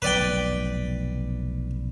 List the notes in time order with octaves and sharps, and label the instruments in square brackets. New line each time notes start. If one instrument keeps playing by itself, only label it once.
[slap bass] F1 B1 [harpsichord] B4 D5 G5